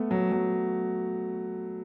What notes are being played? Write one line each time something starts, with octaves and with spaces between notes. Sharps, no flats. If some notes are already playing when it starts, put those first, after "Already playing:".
Already playing: A3 B3
F#3
F#3